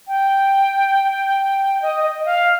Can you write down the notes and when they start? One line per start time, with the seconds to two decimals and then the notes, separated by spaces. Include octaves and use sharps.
0.08 G5
1.82 D#5
2.04 D#5
2.25 F5